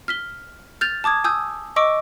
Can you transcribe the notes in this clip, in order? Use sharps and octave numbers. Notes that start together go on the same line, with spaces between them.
F6 B6 G7
F6 G6 A6 F7
A5 D6 D#6 G#6
G#5 D#6 E6 G6
D#5 C#6 D6 E6 D7